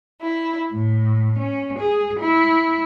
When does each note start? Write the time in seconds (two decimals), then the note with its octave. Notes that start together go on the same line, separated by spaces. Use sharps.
0.20 E4
0.72 A2
1.39 C#4
1.79 G#4
2.19 E4